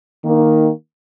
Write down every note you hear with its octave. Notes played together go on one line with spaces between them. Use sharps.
D#3 A#3 D#4